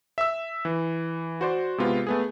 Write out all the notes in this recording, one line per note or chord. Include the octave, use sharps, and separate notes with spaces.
E5 E6
E3
F#4 C5 D5
C3 G#3 B3 F4
A3 B3 G#4